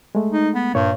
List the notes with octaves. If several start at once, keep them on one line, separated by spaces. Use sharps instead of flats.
G#3 A3
D#4
B3
G2 A#2 C#5